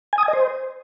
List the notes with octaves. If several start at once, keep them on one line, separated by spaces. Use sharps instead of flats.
G#5
D#6
G#5
D#5
C5